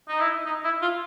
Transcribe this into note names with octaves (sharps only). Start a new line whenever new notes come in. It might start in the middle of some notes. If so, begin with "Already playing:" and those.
D#4
E4
D#4
E4
F4